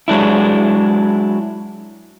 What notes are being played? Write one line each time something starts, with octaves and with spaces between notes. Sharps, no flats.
F#3 G#3 D4 E4